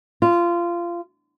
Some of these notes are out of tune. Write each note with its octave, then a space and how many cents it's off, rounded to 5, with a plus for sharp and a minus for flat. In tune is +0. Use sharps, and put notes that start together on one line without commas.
F4 -20